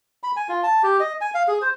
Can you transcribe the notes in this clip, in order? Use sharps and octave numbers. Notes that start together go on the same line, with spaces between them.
B5
G#5
F4
A5
G4
D#5
G#5
F5
G#4
C5